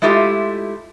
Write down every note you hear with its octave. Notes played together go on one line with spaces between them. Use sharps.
G#3 A3 E4 F4 G4